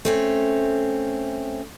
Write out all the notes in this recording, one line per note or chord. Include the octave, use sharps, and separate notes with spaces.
A3 C4 C#4